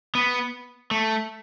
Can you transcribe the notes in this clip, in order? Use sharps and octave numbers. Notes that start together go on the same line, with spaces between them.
B3
A3